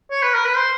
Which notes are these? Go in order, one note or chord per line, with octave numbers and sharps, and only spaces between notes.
C#5
B4
A#4
B4
C5